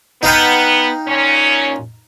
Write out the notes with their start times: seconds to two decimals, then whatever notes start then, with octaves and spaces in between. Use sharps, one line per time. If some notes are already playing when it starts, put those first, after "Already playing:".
0.23 B3 D#4 F5 G5
1.08 A#2 C#4